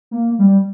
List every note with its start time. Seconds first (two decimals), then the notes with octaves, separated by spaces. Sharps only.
0.11 A#3
0.39 G3